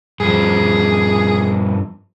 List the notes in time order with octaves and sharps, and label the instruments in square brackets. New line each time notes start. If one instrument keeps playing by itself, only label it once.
[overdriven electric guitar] G2 F3 [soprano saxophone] G#4